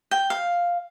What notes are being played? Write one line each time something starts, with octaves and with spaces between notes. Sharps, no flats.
G5
F5